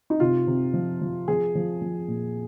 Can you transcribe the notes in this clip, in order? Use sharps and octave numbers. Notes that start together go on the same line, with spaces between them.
D#4
C3 F4
C3
F3
F3
F3 G#4
F3
F3
A#2